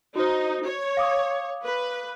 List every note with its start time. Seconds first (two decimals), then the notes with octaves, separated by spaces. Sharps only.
0.16 D#4 F#4 C5
0.65 C#5
0.97 F5 D6 D#6
1.63 B4